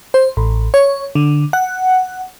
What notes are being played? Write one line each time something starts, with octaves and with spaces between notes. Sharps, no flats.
C5
A1
C#5
D3
F#5